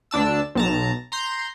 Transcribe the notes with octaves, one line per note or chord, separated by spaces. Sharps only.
D2 D4 A5 E6
B1 A5 A#5
A#5 C6 G6